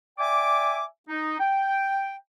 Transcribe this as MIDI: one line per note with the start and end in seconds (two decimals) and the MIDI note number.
0.19 0.83 74
0.19 0.83 76
0.19 0.83 79
0.19 0.83 80
0.19 0.83 86
1.09 1.38 63
1.40 2.15 79